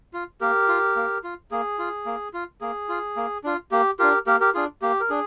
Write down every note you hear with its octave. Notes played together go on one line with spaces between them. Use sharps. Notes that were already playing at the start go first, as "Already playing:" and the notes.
F4
A#3 G4 A#4
F4
A#3
F4
A#3 G#4
F4
A#3
F4
A#3 G#4
F4
A#3
D4 F4
A#3 G4
D4 F4 G4 A#4
A#3 G4 A#4
G4 A#4
D4 F4 G#4
A#3 G4
A#4
D4 G#4